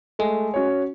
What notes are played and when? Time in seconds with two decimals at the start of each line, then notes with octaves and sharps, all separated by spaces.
0.19 G#3 A3
0.54 C#4 F#4 C#5